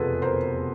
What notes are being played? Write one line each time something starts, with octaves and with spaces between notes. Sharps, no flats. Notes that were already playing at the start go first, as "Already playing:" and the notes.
Already playing: F1 E2 B2 F4 G#4 A4 B4
A#4 C5